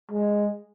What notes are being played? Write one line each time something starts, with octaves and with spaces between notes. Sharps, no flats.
G#3